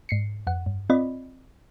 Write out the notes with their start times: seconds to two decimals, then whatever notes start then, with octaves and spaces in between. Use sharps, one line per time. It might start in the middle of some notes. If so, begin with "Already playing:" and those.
0.09 G#2 C7 C#7
0.47 F2 F#5
0.66 G2
0.90 C4 F4 D5 D#5 B5